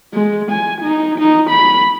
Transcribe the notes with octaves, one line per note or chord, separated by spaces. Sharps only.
G#3
G#5
D#4
D#4
B5